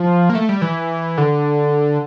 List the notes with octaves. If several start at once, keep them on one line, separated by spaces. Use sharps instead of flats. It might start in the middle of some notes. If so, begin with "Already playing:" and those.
Already playing: F3
A#3
A3
G3
E3
D3